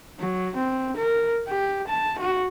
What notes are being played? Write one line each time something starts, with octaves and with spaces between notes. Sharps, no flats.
F#3
C4
A#4
G4
A5
F#4